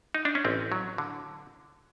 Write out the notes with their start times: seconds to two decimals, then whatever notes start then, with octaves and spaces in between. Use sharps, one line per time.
0.14 D#4
0.25 D4
0.35 C#4
0.45 A1 C4
0.72 F#3
0.98 D3